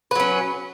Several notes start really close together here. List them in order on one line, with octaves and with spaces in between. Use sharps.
B4 F#3 C#4